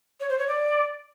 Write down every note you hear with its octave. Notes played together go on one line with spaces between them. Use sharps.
C#5
C5
C#5
D5